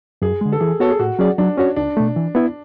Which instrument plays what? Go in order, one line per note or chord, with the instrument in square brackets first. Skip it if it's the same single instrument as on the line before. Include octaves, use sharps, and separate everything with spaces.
[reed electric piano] F#2 [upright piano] G#4
[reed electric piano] D3 G#3
[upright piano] A4
[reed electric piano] E3 [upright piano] G#4
[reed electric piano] B3 F#4 C#5 [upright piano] A4
[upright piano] G#4
[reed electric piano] A2 [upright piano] F#4
[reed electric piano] F#3 C#4 G#4 D5
[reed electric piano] F#3 [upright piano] D4
[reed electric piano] C#4 F#4 C#5
[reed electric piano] C#2 [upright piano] D4
[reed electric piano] B2 A3
E3
B3 E4